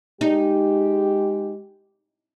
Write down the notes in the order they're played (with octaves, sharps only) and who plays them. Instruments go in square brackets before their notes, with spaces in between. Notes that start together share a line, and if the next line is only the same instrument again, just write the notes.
[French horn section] G#3 G4 [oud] D#4